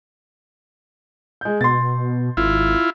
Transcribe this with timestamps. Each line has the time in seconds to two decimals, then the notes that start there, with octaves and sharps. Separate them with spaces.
1.41 G#3 G6
1.61 B2 C6 A6
2.37 G#1 E4 F4